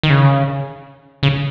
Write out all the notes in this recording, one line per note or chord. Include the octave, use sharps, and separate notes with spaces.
D#3
C#3
C#3